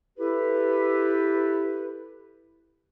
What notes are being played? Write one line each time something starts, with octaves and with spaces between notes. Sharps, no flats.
E4 G4 A4 B4